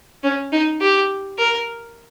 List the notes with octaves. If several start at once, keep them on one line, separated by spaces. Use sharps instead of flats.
C#4
D#4
G4
A#4